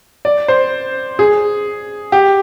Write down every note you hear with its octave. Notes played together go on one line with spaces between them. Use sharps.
D5
C5
G#4
G4